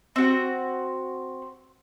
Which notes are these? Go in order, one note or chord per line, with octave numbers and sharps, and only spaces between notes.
C4 F#4